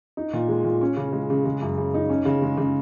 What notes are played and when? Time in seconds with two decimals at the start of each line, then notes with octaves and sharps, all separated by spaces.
0.17 D#4
0.33 A#2
0.48 G#3
0.65 A#2
0.81 C#4
0.97 C#3
1.13 G#3
1.30 C#3
1.45 G#3
1.62 F#2
1.78 C#3
1.94 D#4
2.10 C#4
2.25 C#3
2.42 G#3
2.57 C#3